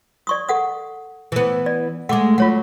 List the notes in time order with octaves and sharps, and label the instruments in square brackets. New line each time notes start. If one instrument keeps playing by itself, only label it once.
[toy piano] D5 C#6 D#6
A4 F#5 D#6
[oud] E3 B3
[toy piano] D5
[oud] G#3 A3 [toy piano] F#5 D6
[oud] F#3 [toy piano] F4 C#5 F#5